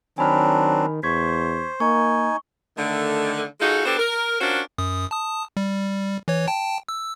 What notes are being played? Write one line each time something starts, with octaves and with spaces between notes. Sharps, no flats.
D#3 F#3 C4 D4 G#5 B5 F6
E2 C5 C#6 G#6 B6
A#3 D#4 G#5 C#6
D3 D#3 A3
G#3 D#4 F4 F#4 G#4 A4
B3 D4 F#4 G4 A4 C5
A#4
C#4 D4 F4 F#4 A#4 C5
F#2 D#6
A5 D#6
G3
E3 C#5
G5 A5
E6